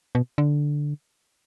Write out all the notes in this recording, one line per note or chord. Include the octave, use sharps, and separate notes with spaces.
B2
D3